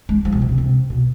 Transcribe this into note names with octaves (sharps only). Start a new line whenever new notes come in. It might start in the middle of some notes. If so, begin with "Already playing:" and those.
G#3
F3
B2
C3
D3
C3
B2